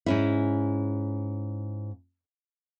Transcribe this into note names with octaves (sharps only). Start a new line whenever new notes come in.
G#2 C#4 E4